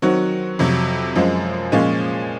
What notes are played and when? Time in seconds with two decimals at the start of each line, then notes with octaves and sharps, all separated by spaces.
0.02 D#3 F#3 C4 F#4
0.59 F2 C3 F#3
1.16 F#2 F3 G#3 C4
1.72 A#2 F3 G#3 C#4 G#4